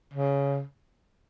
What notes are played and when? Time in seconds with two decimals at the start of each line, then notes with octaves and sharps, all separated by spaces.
0.14 C#3